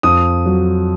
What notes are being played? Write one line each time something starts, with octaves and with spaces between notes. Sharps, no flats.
F2 D#6
F#3